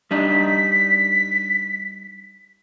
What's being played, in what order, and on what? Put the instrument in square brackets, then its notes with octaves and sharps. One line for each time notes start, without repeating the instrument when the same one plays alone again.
[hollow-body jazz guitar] G3 D4 D#4 [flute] B6